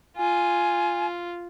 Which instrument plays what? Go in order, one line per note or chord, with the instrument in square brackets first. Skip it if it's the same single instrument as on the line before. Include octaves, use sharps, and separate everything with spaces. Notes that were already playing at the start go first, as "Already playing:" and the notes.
[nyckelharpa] F4 [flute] G#5